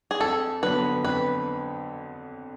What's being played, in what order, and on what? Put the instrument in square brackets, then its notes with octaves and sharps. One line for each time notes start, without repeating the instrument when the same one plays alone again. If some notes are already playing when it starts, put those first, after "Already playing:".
[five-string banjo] G#4
[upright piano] F2 [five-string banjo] A4
[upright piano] D3 F#3 B3 [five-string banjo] B4
[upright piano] F2 [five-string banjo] B4